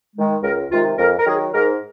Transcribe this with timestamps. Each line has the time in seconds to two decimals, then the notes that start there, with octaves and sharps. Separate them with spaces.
0.15 D#3 G#3
0.43 C#2 A#4
0.71 C3 D#3 G#3 F4
0.98 F2 A#4
1.18 A#4
1.26 D#3 F#3 G#4
1.54 G#2 A#4